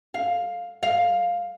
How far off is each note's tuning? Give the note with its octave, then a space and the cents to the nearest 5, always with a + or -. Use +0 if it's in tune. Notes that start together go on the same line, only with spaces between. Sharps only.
F5 +10
F5 +5